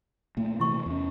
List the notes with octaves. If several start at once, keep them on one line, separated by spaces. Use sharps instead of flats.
A#2 A3 A#3
C3 E3 A3 E4 C#6
E2 C#4